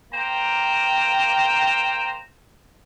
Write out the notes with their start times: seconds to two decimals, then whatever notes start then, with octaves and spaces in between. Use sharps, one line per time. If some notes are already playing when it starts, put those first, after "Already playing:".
0.13 A#3 C5 G5 A#5